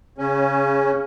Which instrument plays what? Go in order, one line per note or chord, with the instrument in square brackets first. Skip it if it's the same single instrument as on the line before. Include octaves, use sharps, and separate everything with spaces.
[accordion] C#3 C#4